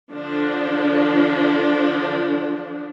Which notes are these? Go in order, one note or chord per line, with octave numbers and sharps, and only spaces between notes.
D3 F3 D4